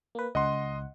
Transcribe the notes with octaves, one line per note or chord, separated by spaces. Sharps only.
A#3 B4
C#2 D#5 F#5 C6